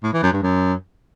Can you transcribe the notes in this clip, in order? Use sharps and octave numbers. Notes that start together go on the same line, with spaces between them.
A2
E3
F#2
G2
F#2